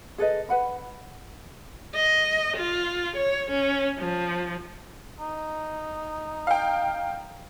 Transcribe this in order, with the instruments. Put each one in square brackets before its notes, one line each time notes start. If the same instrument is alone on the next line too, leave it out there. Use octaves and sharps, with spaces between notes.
[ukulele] G#4 A4 B4 D#5
B4 F#5 B5
[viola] D#5
F4
C#5
C#4
F3
[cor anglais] D#4
[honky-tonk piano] F5 G5